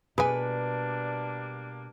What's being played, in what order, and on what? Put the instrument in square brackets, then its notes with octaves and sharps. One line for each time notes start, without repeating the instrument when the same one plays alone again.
[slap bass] B2 [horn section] G3 A#3 D4 [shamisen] G#4 G#5 [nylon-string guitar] B4